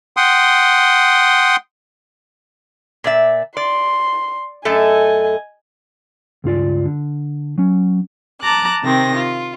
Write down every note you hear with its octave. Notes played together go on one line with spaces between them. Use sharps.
F#5 G5 C6 D#6
A#2 D5 E5
D5 C6
F#2 A3 A4 D#5 G#5
C#2 G2 F4 D5
D3
F#3 C#4
A5 A#5 D6 F#6
C3 D#3 C4 A#6
F4